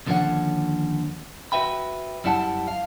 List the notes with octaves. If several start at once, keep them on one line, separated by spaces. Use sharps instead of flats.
D#2 D3 F3 C#4 C#5 F#5
F#4 B4 E5 G5 B5
F#2 G3 E4 F#5 A5
F5